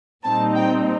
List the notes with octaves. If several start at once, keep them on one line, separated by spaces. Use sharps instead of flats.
A#2 G3 C4 D#4 A5
G5